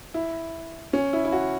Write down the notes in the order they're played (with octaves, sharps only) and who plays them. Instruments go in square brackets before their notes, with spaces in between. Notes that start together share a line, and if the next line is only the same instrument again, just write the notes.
[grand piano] E4
C#4
E4
E4
F#4